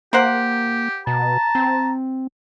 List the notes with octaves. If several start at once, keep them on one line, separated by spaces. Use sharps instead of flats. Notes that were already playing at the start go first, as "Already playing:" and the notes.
A#3 G4 A#4 C5 F#5
B2 A5 A#5
C4